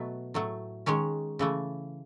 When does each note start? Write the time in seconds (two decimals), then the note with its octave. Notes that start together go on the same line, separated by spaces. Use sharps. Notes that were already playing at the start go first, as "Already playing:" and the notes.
Already playing: B2 F#3 A3 B3 B4
0.34 A2 F#3 A3
0.86 D#3 G#3 C#4 C#5
1.39 C#3 E3 A3